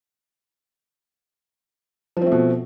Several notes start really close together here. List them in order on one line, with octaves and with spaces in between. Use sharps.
F3 C4 A3 B2